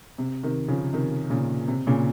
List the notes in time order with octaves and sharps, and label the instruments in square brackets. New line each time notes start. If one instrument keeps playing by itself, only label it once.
[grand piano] C3
C3 D#3
C#3 F3
C3 D#3
A#2 C#3
C3
A#2 C#3